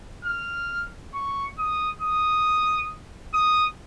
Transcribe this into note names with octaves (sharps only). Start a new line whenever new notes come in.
F6
C#6
D#6
D#6
D#6